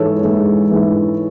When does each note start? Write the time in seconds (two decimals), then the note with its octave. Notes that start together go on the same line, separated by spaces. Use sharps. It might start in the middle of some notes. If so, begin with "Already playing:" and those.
Already playing: G#2 E3 G#3 A4 C#5
0.23 G#2 E3 G#3
0.71 G#2 E3 G#3